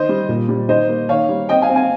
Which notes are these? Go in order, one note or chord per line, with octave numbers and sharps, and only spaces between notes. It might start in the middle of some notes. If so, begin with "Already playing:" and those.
Already playing: D#3 C5 D#5
G3
A#2
G3
D#3 C5 D#5
A#3
D#3 C#5 F5
G3
C4 D#5 G5
F5 G#5
C4
F5 G#5